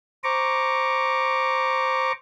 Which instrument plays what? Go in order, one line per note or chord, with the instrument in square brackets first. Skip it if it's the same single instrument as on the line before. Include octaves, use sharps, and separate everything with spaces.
[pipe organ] C5 A#5 C#6 D6